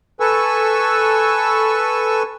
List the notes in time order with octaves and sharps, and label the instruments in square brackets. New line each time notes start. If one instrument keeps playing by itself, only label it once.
[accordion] A4 B4 G#5 C#6 E6